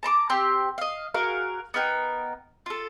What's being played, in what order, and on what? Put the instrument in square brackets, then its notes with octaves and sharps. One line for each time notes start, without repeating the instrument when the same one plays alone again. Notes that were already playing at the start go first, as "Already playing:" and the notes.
[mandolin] A5 A#5 C6 D6
C4 G4 C6
D#5 F5
F#4 G#4 A#4 F5
B3 D#4 A#4 G5
F4 A4